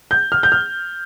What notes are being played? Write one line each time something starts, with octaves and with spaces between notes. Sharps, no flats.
G6
F6
G6
F6